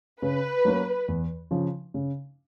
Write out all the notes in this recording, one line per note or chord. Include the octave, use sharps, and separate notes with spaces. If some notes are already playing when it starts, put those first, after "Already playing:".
C#3 B4
F#3 A#3 C#4
E2
C#3 F3
C#3